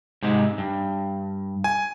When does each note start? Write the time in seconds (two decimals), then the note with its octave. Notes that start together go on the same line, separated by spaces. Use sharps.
0.23 G#2 C3 G#3
0.58 G2
1.64 G#5